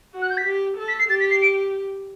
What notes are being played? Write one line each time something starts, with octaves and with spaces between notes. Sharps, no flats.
F#4
F#6
G6
B6
G4
A4
B6
C7
G4 A6
B6
C7
D7